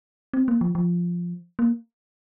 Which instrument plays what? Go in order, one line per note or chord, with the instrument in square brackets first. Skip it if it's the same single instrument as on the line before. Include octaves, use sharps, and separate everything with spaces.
[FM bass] C4
A#3
F3
F3
A#3